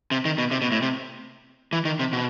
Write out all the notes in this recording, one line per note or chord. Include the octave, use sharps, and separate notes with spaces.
C3
D#3
B2
C3
B2
A2
C3
E3
D#3
C3
B2